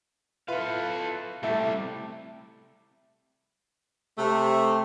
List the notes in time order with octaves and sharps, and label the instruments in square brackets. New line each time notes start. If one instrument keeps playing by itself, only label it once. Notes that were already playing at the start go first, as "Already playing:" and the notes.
[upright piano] E4 F4 B4 [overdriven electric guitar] A4 F5
[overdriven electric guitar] C3 G3 [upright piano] A3 E4 A4
[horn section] C3 A3